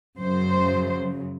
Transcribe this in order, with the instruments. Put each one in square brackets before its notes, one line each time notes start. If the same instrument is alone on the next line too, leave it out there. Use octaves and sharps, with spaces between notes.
[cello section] F#2 C#3 F#3 C5